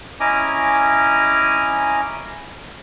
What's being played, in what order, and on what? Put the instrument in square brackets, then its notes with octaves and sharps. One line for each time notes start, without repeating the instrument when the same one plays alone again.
[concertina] C#4 E4 D#5 G#5 A#5 D6